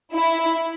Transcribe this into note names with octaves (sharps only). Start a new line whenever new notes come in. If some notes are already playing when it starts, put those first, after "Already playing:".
E4